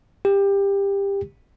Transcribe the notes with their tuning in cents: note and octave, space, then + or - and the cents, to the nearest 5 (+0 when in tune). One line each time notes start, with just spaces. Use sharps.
G4 +20